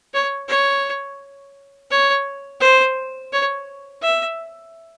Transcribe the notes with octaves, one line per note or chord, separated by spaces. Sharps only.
C#5
C#5
C#5
C5
C#5
E5